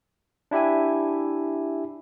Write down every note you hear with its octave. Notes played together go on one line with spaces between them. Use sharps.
D4 E4 G4 E5 G#5